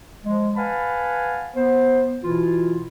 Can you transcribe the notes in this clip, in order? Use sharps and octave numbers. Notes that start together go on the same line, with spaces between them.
F3 G#3
B4 F5 F#5 G#5 A5 B5
B3 C5
B2 E3 E4 F4